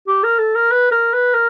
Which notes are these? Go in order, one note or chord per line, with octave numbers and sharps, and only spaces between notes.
G4
A#4
A4
A#4
B4
A#4
B4
A#4